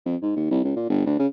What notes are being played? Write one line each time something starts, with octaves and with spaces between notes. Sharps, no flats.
F2
G#2
D#2
C2
C#2
A#2
G1
D2
C#3